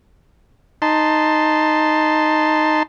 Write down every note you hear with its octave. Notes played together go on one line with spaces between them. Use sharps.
D#4 A5 C6